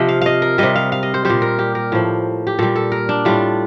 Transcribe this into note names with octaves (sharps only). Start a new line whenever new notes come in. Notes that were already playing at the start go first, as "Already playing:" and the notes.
Already playing: C3 F3 D#5
F5
D#5 F5
A#4
C3 G3 D#5
F5
F5
D#5
C5
A#2 G3 C5
A#4
G4
A#4
A2 F3
G4
A#2 G3 A4
A4
A#4
D4
A2 G3 F4